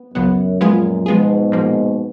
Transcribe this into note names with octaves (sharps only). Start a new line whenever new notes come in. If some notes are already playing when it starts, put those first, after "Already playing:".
Already playing: B3
C#2 F#2 C#3 F#3 B3
F#2 A#2 F3 G#3 B3 F4 G#4
G#2 B2 F3 G#3 B3 F4 G#4
A#2 F3 A#3